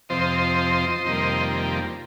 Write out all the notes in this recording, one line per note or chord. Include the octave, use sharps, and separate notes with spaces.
F2 C3 F3 C4 C5 D#5
F2 C3 D#3 G3 A#3